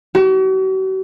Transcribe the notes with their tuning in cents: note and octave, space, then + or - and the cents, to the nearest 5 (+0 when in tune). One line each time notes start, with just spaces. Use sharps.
F#4 +45